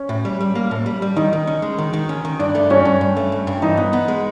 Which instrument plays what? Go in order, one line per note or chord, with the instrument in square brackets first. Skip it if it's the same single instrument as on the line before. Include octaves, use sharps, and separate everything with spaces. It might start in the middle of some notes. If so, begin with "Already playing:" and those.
Already playing: [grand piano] C#4
[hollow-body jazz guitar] A2
G3
G3
A#3
A2
G3
G3
[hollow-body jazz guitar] D#3 [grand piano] D#4
[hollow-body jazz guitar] D#3
C#4
G#3
D#3
D#3
C#4
D#3
[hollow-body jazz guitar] G2 [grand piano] D4
[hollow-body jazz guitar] A3
[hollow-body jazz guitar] G2 [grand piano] C#4
[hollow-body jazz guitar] G2
G2
A3
G2
G2
[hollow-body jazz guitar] E3 [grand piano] D#4
[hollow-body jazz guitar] B3
B3
G#3